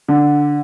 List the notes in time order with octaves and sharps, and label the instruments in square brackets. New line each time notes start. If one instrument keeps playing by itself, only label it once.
[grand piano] D3